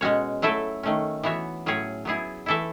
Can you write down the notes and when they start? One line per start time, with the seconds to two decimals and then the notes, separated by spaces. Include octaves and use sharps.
0.01 B2 G#3 C#4 F#4 C#5
0.42 F#3 A3 E4 A4 E5
0.83 D#3 A3 C#4
1.23 E3 B3 F#4 C#5 E5
1.66 A2 F#3 C#4 G#4 C#5
2.05 F#3 B3 E4 G#4
2.46 E3 A3 E4 A4 E5